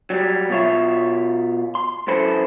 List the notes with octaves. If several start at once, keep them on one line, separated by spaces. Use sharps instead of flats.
F#3 G3
B2 F4 C#5 E5
C6
F#2 E3 A4 C5 B5